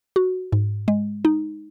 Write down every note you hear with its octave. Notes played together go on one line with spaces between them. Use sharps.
F#4
G#2
G#3
D#4